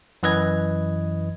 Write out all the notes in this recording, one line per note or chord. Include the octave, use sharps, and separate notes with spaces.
F#2 E3 B4 D#5 G#6